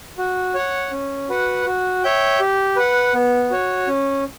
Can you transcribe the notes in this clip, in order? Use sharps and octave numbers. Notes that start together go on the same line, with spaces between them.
F#4
C#5 F#5
C#4
F#4 B4 F#5
F#4
C#5 E5 G5
G4
B4 F#5
B3
F#4 C#5
C#4